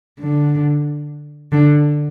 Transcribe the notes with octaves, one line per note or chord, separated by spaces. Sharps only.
D3
D3